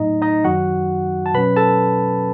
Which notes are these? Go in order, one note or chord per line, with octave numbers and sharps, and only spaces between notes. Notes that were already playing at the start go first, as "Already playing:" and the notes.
Already playing: A2 F#3 A3 D#4 D#5
D#4 D#5
F#2 D#3 F#3 F#4 F#5
A5
B2 F#3 C#4 B4 B5
A4 A5